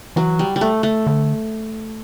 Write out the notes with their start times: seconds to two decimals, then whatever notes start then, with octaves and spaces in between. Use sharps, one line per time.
0.16 E3 F#3
0.39 G3
0.56 G3
0.61 A3
0.83 A3
1.07 D3